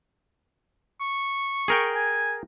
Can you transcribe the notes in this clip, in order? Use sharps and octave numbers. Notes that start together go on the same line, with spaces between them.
C#6
G#4 A#4 G5
G#5